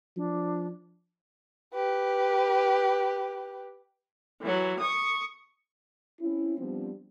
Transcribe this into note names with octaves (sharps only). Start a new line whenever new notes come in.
F3 D4
G4 B4
E3 F#3
C#6 D#6
C4 C#4 E4
F3 G3 B3 C4 D4